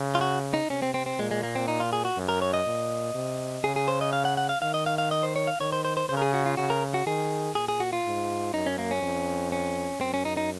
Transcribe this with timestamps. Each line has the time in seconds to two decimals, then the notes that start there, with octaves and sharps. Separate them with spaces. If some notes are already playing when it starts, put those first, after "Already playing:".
Already playing: C#3
0.15 F4
0.21 F#4
0.54 D#4
0.69 C3 C#4
0.82 C4
0.94 C4
1.06 C4
1.19 A#2 G#3
1.31 G#3
1.43 A#3
1.55 C4
1.68 D#4
1.80 F4
1.93 G#4
2.05 F#4
2.17 F#2
2.29 A#4
2.42 C#5
2.54 D#5
2.66 A#2
3.14 C3
3.64 C#3 G#4
3.76 G#4
3.88 C5
4.01 D#5
4.13 F5
4.25 F#5
4.37 F#5
4.49 F5
4.62 D#3 F5
4.74 D#5
4.86 F5
4.98 F5
5.11 D#5
5.23 C5
5.36 C#5
5.47 F5
5.60 D#3 C#5
5.72 C5
5.85 C5
5.97 C5
6.09 C#3 C5
6.17 A#4
6.22 G#4
6.34 F#4
6.46 F4
6.57 C#3 F#4
6.70 A#4
6.94 F#4
7.06 D#3 G#4
7.55 A#2 G#4
7.68 G#4
7.80 F#4
7.93 F4
8.05 G#2
8.54 F#2 D#4
8.66 C#4
8.78 A#3
8.91 C#4
9.03 F2
9.52 C#4
10.01 F#2 C4
10.14 C#4
10.25 D#4
10.37 D#4